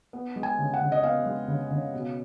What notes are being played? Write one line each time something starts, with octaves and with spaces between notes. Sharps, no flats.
B3
G#3
G#5
C#3
F#5
C#3
D#5
B3 F5
G#3
C#3
C#3
B2